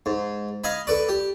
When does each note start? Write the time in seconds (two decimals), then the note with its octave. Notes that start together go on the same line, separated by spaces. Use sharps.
0.06 G#2
0.64 D#5 F5 G#5 B5
0.87 A4 B4 D5
1.09 G4